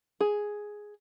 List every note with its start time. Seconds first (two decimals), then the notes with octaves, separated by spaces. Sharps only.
0.20 G#4